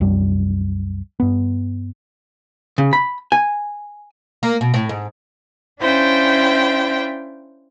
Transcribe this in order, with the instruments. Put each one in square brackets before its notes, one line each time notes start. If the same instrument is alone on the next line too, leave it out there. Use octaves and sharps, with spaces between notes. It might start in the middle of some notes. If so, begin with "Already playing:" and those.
[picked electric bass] C2 F#2 G3
G2 B3
[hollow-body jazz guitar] C#3
B5
G#5
[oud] A#3
B2
A2
G#2
[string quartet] C#4 D4 E4 C5 F5 G5